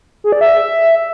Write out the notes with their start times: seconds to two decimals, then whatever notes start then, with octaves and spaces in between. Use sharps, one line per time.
0.24 G#4
0.32 D5
0.41 E5